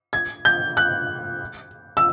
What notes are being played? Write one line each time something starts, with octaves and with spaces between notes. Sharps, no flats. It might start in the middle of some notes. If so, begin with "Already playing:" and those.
G#6
G6
F#6
E6